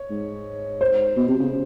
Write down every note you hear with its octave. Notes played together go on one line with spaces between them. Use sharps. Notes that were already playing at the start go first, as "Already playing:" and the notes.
Already playing: C#5
G#2
C5
B2
C3
C#3